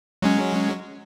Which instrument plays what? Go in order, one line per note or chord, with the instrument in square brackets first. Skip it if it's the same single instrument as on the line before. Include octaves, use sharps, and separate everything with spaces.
[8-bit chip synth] F#3 G#3 C#4